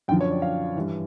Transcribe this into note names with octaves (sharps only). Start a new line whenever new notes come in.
F#2 D3 F3 G5
C#5
D5
F5
G2 E3